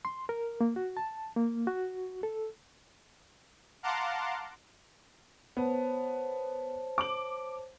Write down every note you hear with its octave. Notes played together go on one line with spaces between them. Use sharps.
C6
A#4
A#3
F#4
A5
A#3
F#4
A4
F5 F#5 A5 A#5 C6 D6
B3 C5 C#5 A5
D6 F#7